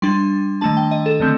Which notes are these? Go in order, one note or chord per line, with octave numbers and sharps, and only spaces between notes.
G3 D4 C6
D#3 A3 D4 A5
G5
D#5
A4
D3 A3 C4